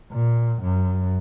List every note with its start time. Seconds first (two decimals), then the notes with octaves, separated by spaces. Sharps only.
0.12 A#2
0.62 F#2